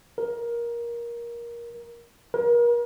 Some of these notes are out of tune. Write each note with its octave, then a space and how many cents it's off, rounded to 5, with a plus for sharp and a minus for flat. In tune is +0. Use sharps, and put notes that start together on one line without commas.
A#4 +15
A#4 +35